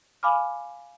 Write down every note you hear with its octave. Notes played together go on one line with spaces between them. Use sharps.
F5 G#5 B5 D6 F6